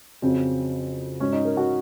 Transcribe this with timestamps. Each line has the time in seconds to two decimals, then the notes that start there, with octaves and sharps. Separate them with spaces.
0.22 F2 C#3 F#3 C4
1.20 G#2 F#3 C#4
1.33 D#4
1.45 A#4
1.57 F#4